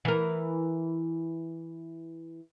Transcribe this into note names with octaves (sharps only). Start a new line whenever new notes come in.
E3 A#4